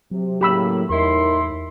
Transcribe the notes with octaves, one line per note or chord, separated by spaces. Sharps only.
C3 F#3
A2 C#3 A#3 G4 B5 E6
E2 A2 D#4 E4 A#4 C6